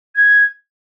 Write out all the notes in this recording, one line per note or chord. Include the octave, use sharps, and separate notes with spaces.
G#6